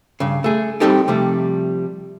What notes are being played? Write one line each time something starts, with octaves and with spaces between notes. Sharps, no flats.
G2 C#3
A3 G#4
G3 C4 D#4 G4 A4 D5
C3 F3 G3 A3